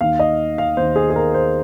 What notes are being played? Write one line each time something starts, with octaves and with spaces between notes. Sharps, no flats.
D#2 D#3 F5
D#5
F5
D#2 D#3 C5
G#4
G#4
A#4
C5